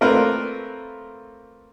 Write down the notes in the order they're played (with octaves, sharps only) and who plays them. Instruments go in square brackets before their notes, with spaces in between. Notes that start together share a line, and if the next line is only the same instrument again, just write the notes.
[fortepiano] A3 A#3 C4 F4 A#4 B4